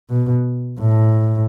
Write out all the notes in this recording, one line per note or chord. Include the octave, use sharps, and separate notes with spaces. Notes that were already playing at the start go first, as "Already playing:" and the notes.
B2
A2